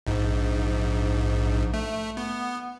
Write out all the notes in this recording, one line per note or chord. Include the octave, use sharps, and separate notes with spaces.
A#1 G#2
A3
B3